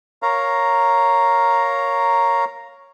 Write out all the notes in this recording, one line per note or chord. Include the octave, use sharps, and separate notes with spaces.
A#4 C#5 F5 A#5